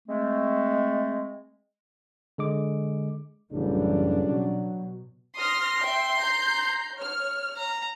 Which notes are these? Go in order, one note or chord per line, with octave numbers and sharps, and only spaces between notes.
G#3 A3 C4
D3 G#3 D6
A1 F#2 C#3 E3 G3 D4
B2 F#3
C6 D#6 F6 A#6
E5 G5
A#5 G6 C7
C#5 F6
A#5